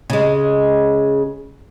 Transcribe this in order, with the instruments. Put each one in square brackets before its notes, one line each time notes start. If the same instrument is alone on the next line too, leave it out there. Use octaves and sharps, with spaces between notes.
[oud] C#3 G#3